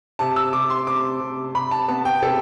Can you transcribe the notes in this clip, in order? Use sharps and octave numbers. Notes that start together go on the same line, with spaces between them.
C3 A5
E6
C3 D6
C6
C3 D6
C3
C3 B5
A5
B3 A5
G5
C3 A4